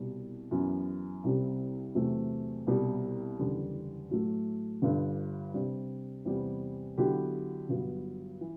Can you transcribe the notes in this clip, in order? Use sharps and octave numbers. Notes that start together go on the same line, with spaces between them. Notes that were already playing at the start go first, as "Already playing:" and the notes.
Already playing: C2 B2 G3
F#2 E3 B3
C2 C3 G3 C4 G4
E2 C3 F#3 A3
C2 B2 G3
F#1 E2 D3 G3
A2 F#3 A3
G1 G2 D3
C3 G3 D4
E2 C3 G3 B3
D3 F#3 B3 E4 G4
G1 G2 F#3 B3
E3